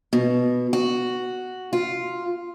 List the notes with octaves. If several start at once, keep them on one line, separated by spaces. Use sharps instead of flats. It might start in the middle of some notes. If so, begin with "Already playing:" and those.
B2
F#4
F4